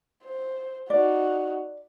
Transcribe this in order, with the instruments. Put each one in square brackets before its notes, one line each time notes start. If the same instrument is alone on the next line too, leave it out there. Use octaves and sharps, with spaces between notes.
[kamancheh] C5
[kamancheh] D#4 F#4 [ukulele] D5